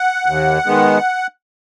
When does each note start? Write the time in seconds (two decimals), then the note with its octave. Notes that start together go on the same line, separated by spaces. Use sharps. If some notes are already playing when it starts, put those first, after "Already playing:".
Already playing: F#5
0.26 D#2
0.66 D#3 G#3 B3